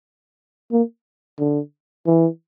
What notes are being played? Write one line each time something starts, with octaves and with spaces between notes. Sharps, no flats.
A#3
D3
E3